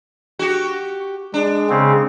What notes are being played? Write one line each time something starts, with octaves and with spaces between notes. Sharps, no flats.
F#4 G4
G#3 D4
C#3 C4